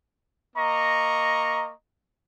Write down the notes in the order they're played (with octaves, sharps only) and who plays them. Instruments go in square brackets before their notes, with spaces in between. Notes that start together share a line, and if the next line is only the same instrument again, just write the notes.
[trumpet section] A#3 D#5 A#5 C#6